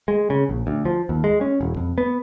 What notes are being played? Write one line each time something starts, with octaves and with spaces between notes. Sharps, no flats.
G#3
C#3
A#1
D2
F3
D#2
G#3
C#4
E1
F2
B3